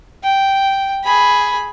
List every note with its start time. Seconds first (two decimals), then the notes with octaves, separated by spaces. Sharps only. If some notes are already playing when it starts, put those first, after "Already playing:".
0.23 G5
1.04 G#4 B5